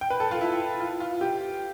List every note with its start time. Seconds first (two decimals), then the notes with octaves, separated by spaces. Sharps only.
0.01 G5
0.10 B4
0.20 A4
0.31 F4
0.41 E4
0.80 F4
1.00 F4
1.21 G4